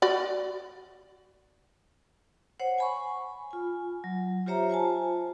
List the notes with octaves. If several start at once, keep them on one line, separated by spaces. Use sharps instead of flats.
F#4 D5 B5
C5 C#5 F#5
G#5 B5 C#6
F4 G#5
F#3
F4 G4 C5 C#5 E5 A#5
F4 C5 G#5 A5